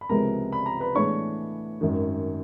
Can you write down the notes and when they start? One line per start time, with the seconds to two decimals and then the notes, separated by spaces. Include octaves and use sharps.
0.01 B5
0.09 C#2 C3 F3 G#3 B3 A#4 A#5
0.52 B5
0.66 A#5
0.80 B4 B5
0.95 A2 E3 G#3 B3 D4 C#5 C#6
1.81 G#1 F#2 D#3